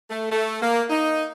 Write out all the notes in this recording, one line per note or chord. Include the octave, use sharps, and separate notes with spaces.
A3
A3
A#3
D#4